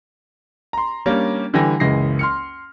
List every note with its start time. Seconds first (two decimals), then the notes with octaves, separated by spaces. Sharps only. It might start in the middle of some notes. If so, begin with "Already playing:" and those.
0.73 A#5 C6
1.06 G3 A#3 C#4 D4
1.54 D3 E3 G3 G5 G#5 A#6
1.80 F#1 C#2 E3 G#3 A#6 C7
2.19 C6 F6 C#7